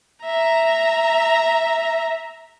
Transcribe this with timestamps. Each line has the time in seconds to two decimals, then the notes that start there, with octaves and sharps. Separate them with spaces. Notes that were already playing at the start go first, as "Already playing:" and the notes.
0.24 E5 A#5